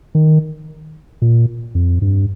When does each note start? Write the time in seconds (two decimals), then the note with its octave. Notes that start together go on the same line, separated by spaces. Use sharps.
0.15 D#3
1.22 A#2
1.75 F2
2.02 G2